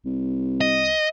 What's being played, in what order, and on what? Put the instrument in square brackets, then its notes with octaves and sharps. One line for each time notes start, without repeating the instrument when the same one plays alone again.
[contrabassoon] C2
[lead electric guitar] D#5